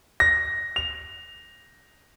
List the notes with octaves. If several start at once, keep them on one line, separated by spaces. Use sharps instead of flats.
A#6
F7